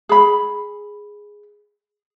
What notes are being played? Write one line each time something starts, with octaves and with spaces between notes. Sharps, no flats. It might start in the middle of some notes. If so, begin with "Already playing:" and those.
G#4 B5